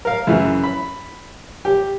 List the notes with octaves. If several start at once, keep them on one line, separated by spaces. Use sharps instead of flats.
A#4 F5
F#2 C#3 E3
B5
G4